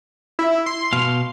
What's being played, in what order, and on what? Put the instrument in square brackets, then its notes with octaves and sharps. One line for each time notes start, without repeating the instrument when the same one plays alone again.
[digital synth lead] E4
C6
[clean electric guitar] B2 F5